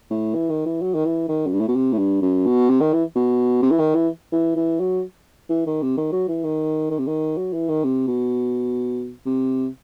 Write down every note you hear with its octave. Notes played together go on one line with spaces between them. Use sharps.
A2
E3
D#3
E3
F#3
D#3
E3
D#3
F#2
G2
A2
B2
C3
A2
G2
F#2
B2
C3
D#3
E3
B2
C3
E3
D#3
E3
E3
E3
F#3
E3
D#3
C3
D#3
F#3
E3
D#3
D#3
C3
D#3
F#3
E3
D#3
C3
B2
C3